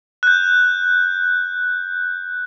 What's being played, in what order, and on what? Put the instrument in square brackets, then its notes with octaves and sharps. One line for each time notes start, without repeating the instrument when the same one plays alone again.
[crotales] F#6 G6